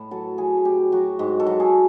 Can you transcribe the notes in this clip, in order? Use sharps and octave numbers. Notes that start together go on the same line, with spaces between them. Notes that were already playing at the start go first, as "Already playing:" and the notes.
Already playing: A2
F#3 A4
F#3 G#4
G#4
A2 G4
F#3 F#4
G#2
A4
F#3
G#4